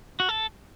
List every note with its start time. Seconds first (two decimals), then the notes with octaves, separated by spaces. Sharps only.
0.20 F#4
0.29 A4